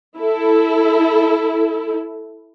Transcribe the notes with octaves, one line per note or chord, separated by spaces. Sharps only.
E4 A4